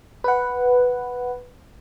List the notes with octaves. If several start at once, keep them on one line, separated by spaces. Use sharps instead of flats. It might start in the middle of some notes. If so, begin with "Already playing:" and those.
B4 F#5